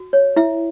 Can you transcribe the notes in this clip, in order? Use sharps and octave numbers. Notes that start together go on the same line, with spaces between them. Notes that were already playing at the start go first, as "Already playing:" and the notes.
Already playing: F#4
C#5
E4 E5